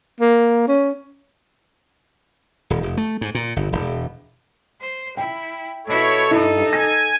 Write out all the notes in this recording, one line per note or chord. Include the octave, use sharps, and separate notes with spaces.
A#3
C#4
D#1
F1
A3
G#2
A#2
G1
E1
C5
E4 G5
B2 E4 A4 C#5
G2 D#4 E4
G#5 A#6